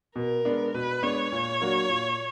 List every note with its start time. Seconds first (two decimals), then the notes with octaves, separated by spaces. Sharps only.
0.16 B2 A#4
0.45 G#3 B3 D4
0.74 B2 B4
1.03 G#3 B3 D4 C#5
1.32 A#2
1.61 F#3 A#3 D4 F#4
1.89 A#2